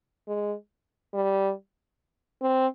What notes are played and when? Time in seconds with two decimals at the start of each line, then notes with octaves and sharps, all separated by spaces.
0.28 G#3
1.14 G3
2.42 C4